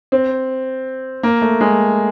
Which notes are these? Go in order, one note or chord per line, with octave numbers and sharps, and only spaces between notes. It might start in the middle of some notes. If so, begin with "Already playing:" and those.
C4
A#3
A3
G#3